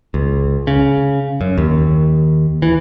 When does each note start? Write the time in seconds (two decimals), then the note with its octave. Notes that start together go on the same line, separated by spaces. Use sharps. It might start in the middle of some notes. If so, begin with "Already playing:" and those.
0.14 C#2
0.67 C#3
1.41 F#2
1.58 D#2
2.62 E3